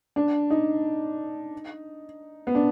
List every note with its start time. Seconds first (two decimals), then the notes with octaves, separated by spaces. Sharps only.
0.16 D4
0.51 D#4
2.47 B3
2.55 D4